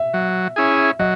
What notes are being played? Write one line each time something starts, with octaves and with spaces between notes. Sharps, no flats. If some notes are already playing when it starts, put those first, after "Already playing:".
Already playing: E5
F#3
C#4 E4 G#4
F#3 D#5